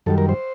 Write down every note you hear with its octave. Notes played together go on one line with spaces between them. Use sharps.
F#2 D#3 G3 A4
A#4
C5